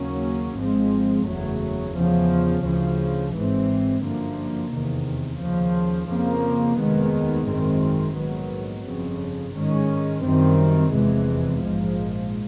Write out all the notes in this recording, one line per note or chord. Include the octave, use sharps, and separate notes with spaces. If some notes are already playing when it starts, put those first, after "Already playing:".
Already playing: D#2 C#3 F#3 A#3 C#4
G#1 G#2 F3 G#3 C4
F#1 E2 C#3 F#3 A3
E2 C#3 F3
D2 C#3 F3
G#1 G#2 E3 G#3 C4
G1 F#2 D3 F3 A#3
F1 E2 C3 D#3
D#2 C#3 F3
F2 C#3 F3 A#3
F1 D#2 D#3 G#3 B3
G#1 F#2 D#3 G#3 C4
A#1 G#2 D#3 F#3 B3
G1 F2 C#3
G#2 D#3 G#3 C#4
F#2 D#3 G3 C4
F1 E2 C3 E3 G#3
A#1 G#2 F3 G#3